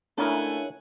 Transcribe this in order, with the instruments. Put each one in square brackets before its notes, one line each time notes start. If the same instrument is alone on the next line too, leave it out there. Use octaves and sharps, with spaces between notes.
[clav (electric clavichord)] C#2 C#3 A#4 [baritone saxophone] A3 [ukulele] D4 E4 [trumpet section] F#5 G#5